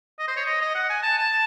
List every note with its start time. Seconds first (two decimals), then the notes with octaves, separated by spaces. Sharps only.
0.19 D#5
0.28 C5
0.37 C#5
0.46 D#5
0.61 D#5
0.75 F#5
0.90 G#5
1.03 A5
1.18 A5